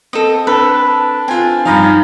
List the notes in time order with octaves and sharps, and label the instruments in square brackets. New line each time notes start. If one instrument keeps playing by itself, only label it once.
[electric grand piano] C4 [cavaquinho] A4 D#5
[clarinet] D4 [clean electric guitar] A4 [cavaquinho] B4
[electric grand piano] C4 F4 [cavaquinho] G#5
[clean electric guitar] G2 F3 [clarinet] D#4 [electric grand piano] F5 A#5 B5